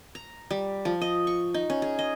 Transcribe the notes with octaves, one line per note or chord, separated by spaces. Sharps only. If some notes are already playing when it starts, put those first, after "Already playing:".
A#5
G3
F3
D#5
C#6
D#4
C#4
G#4
D#5